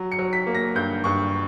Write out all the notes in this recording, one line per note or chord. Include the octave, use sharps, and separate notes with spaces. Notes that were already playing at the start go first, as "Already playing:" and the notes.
Already playing: F#3
C#7
F#3
B6
A#3
A#6
G2 G6
G2 C#6